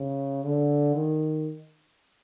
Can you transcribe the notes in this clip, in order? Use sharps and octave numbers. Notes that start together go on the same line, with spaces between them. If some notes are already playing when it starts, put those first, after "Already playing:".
Already playing: C#3
D3
D#3